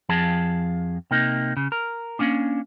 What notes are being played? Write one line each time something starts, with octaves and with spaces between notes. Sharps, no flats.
F2 F3 G#4 A5
C3 A#3 D#4
C#3
A#4
A#3 C#4 D4